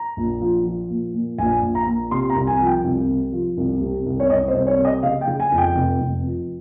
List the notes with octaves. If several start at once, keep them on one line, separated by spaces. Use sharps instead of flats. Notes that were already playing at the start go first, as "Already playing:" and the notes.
Already playing: A#5
A#1
F3
F3
A#2
A#2
A#1 G#5
A#1
A#5
A#2
C3 C6
A#5
C2
G#5
F3
G5
C2
C3
F3
C2
C3
C2
C#5
C2 D#5
C5
C2
C#5
C3
D#5
C#3 F5
G5
C#3
G#5
F2
G5
F1
F1
F3